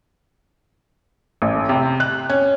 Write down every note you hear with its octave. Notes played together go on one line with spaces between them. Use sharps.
A1
C3
F#6
C#4